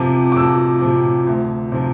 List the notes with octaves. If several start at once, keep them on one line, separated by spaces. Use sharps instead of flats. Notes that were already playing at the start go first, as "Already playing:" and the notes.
Already playing: F2 C3 F3 D6
D6
F2 E6
C3 F3
D2
C3 F3